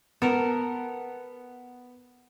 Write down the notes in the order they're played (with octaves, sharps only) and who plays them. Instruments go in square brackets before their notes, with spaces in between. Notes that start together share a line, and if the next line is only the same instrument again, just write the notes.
[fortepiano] B3 [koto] A4 A#4